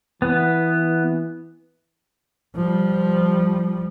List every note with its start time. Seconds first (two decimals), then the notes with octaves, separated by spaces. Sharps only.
0.22 E3 B3
2.56 F3 G3